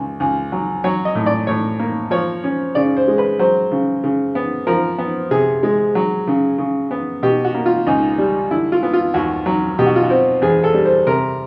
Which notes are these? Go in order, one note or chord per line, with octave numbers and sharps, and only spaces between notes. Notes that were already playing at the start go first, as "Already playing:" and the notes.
Already playing: C#2
C#2
F#3
F#3 C#5
D#5
A2
D5
A2 C#5
A#3
F3 C#5
C#4
C#3 D5
C5
G#3
B4
F#3 C5
C#3
C#3
B3
F3 A#4
B3
C3 G#4
G#3
F#3
C#3
C#3
B3
B2 G4
F#4
A#3
F4
C#2 D#4
G3
D3 E4
F4
B3
F4
D#2 F#4
F#3
B2 G4
F#4
F4
F#4
C4
E2 G#4
A4
G3
C5
C3 A#4